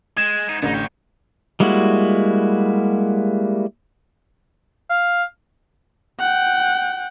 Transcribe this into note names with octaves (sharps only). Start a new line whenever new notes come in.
G#3 G#6 E7
G#2 D#4
A1 D3 B3 D#4
C#5 G5
G3 G#3 A#3 E4 F#4
F5
F#5 G5